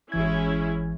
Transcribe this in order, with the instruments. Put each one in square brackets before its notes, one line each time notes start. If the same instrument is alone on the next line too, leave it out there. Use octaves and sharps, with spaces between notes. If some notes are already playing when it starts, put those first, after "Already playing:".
[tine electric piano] G#1 E3 G#6 [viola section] G#3 C#4 E4